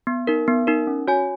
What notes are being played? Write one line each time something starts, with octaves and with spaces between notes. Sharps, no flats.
B3
D#4 A#4
B3
D#4 A#4
C#4
F#4 C#5 G#5